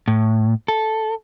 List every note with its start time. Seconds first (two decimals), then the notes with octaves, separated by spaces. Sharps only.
0.08 A2
0.68 A4